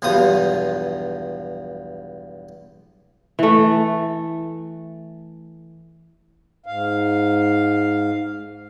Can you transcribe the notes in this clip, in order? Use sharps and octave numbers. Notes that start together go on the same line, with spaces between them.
B1 E2 G2 F3 D#6
E3 A3
G#2 F5